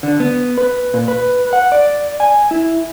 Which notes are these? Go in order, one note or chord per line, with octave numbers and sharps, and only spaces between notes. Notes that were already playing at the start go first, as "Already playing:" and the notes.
D3
B3
B4
A#2
B4
F#5
D5
G#5
E4